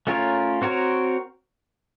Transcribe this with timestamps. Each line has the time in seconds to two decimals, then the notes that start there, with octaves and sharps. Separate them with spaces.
0.07 A3 C#4 F4 A#4 C#5
0.62 C4 F#4 A#4 C#5